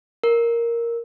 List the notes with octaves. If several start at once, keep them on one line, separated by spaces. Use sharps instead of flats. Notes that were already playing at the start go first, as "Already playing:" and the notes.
A#4